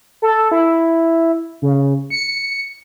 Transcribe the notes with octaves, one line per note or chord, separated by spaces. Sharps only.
A4
E4
C#3
C#7